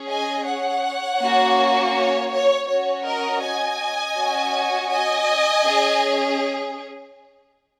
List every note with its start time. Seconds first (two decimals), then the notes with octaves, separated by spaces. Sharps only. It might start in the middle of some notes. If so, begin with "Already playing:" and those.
Already playing: C#4 G#4
0.09 D#5 G#5
0.46 C#5 F#5
1.20 A#3 C#4 F#4
1.94 C#5
2.31 C#5
2.68 C#4 F#4 C#5
3.05 A#4 D#5
3.42 D#5 G#5
4.16 C#4 F#4
4.91 D#5 G#5
5.64 C#4 G#4